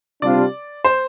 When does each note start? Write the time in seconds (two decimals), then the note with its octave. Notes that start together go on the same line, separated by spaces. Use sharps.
0.22 C3 G3 D4 F4 D5
0.85 C5